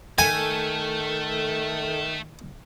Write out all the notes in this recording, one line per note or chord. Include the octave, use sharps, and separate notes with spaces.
D#3 A3 A4 G#5